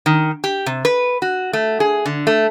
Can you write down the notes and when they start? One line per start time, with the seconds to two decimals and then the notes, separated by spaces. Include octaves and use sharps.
0.06 D#3
0.44 G4
0.66 C3
0.85 B4
1.22 F#4
1.53 A3
1.80 G#4
2.06 D3
2.27 A3